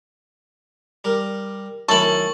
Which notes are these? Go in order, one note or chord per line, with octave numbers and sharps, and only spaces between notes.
G3 A#4
F#2 D#3 A3 E4 A4 C#6 F#7